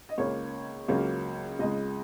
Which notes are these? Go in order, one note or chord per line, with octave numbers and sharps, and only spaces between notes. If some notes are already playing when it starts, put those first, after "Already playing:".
D#5
C#2 C#3 A#3 C#5
C#2 C#3 F#3 A#3 C#4
C#2 C#3 G#3 D#5